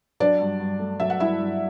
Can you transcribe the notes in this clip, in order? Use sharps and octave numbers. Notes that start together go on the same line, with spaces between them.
F#3 D4 D5
G2
G2
A3
F#3 E5
F#5
G2 E4 E5
G2